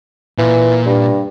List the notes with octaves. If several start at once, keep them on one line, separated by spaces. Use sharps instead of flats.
A#2 E3
G2